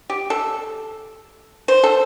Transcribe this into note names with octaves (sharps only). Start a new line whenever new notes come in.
G4
A4
C5
A4